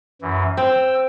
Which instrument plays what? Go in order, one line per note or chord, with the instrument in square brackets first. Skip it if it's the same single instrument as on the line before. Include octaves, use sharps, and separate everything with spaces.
[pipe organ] F#2 E3
[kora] C4 [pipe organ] G5 E6